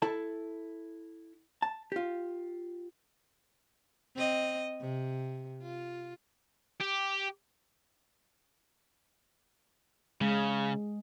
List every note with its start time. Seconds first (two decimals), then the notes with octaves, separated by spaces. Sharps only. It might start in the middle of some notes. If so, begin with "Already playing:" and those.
0.02 E4 A4 A5
1.62 A5
1.92 F4 G4
4.16 C4 D#5
4.81 C3
5.62 F4
6.81 G4
10.21 C#3 G#3